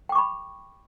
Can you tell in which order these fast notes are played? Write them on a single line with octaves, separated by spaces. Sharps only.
G5 D6 C#6 B5